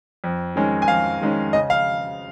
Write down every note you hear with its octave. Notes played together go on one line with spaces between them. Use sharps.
F2
D#3 G#3 C#4
G#5
F2 F5
D#3 G#3 C#4
C#3 D#5
F5